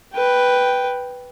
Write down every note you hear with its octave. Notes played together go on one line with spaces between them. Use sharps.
B4 G5